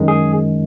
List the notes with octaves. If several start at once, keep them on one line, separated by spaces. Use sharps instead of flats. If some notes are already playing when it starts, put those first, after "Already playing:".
Already playing: F#2 D#3 G#3
G#4